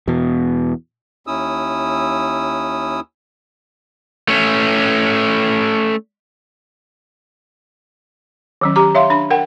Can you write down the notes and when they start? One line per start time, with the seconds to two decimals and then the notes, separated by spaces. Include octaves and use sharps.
0.08 E2 B2
1.27 D#2 C#4 E4 D#6 E6
4.28 A3 C#4
8.61 D#3 F#3 C#4
8.76 G4 A#5 D6
8.95 C#5 E5 F5 C6
9.10 D4 B5
9.30 A#4 F#5 G5